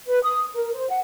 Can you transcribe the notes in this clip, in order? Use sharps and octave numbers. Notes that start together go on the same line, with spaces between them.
B4
D#6
A#4
C5
F#5